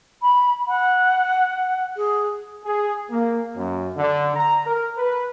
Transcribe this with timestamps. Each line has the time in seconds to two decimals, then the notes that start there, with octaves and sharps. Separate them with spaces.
0.22 B5
0.67 F#5
1.96 G#4
2.65 G#4
3.09 A#3
3.55 F#2
3.96 D3
4.34 A#5
4.66 A#4
4.98 B4